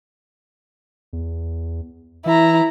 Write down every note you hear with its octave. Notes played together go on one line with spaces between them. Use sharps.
E2
E3 E4 A#5